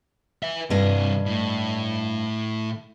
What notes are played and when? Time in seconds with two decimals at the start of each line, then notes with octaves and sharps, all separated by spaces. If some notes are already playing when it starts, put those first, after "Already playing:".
0.43 B4 E5
0.70 G2 C3 E3 D#5
1.26 A2